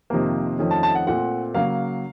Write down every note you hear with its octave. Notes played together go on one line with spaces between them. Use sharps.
F2 C3 D#3 A#3
F2 D#3 A3 C#4
A5
A5
F#5
A#2 A3 C4 F#5
C#3 F#3 A#3 F5